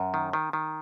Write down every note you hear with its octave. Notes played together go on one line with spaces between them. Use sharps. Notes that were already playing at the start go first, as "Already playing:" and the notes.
Already playing: F#2
D#3
D#3
D#3